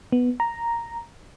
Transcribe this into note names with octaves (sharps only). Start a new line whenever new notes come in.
B3
A#5